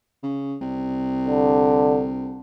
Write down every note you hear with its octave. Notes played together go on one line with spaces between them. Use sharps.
C#3
C2
D3